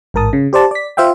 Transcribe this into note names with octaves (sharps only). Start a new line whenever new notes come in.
A1 G#2 A#4 A5 D#6
C#3
G4 C5 D5 A5
D5 B6
F4 C5 E5 F5 G5